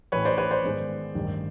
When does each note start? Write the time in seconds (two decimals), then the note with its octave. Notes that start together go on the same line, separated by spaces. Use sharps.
0.12 A1 A2 E3 B4 C#5
0.25 C5 D5
0.38 B4 C#5
0.51 C5 D5
0.64 G#2 D#3 G#3 B3
1.15 A1 G2 D#3